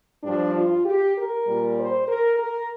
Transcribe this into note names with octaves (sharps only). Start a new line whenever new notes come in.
G2 F3 D4
F4
G4
A#4
A#2 G3
C5
A#4
A#4